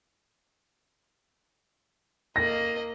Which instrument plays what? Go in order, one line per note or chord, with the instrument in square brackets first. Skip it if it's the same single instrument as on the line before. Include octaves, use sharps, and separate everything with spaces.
[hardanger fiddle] A#3 D#5 [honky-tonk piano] A#6